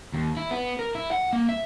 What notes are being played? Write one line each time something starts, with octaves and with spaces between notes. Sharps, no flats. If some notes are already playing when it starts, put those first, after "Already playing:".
D#2
E4
B3
A#4
E4
F#5
A#3
E5